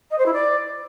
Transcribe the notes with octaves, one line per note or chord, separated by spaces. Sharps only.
D#5
C5
E4
D5